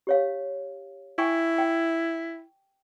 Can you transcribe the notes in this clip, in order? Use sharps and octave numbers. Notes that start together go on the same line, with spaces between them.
G4 C#5 F5
E4 G5 G#5 C#6
G5